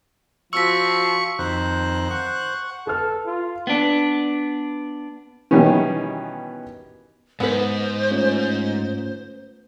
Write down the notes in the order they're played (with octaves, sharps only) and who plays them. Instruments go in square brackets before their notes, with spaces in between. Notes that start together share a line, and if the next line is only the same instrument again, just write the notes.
[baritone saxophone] F3 [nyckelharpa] F#4 [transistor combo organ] C#6 [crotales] E6 B6
[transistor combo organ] F2 D#3 [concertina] C5 F#6
[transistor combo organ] F#5 C#6
[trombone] A4 [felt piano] B4 F6
[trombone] F4
[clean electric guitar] B3 D4
[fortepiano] B2 D#3 E3 G3 B3 C#4
[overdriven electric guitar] G#2 [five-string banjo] B3 B4 [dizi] C5
[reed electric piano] A3 C#4 F4